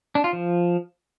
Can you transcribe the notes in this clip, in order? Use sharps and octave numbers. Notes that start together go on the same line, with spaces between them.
D4
F4
F3